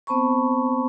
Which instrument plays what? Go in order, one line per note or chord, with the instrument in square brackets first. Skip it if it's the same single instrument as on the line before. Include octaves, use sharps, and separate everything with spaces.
[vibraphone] B3 C4 C5 A5 B5 C#6